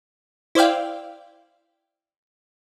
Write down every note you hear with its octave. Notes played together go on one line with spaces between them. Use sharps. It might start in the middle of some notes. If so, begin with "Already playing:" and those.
E4 C5 D5 F5 G5